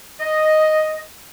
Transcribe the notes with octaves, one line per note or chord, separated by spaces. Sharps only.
D#5